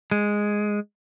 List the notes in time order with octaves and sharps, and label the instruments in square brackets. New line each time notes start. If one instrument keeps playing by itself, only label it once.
[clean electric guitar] G#3